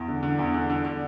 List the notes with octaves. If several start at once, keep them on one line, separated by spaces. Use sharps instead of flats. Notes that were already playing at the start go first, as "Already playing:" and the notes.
Already playing: E2
D3
D3
E2
D3
D3
D3